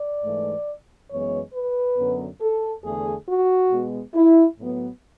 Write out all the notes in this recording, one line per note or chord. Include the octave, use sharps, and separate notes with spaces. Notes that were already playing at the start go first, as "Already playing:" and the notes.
Already playing: D5
G#2 E3 A3
F#2 E3 G#3 B3 C#5
B4
F#2 D3 F#3 B3
A4
E2 D3 A3 G#4
F#4
B2 G#3 B3
E4
A2 F#3 B3